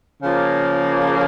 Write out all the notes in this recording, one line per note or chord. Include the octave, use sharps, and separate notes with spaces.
C#3 F3 A#3